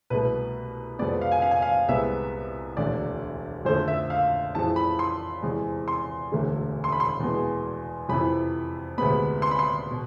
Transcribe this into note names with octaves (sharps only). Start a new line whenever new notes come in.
C2 B2 A3 B4
F2 C3 G#3 B3 D5
F5
G#5
F5
G#5
F5
C2 C3 G#3 B3 E5
E1 D2 D3 D5
F2 D3 A3 C5
E5
F5
F2 E3 G#3 A5
B5
C6
E2 C3 G#3
C6
E1 D2 D3 A3
C6
B5
C6
E2 B2 G#3 B3
F2 C3 E3 B5
D2 C3 G#3 B3 B5
C6
B5
C6
B2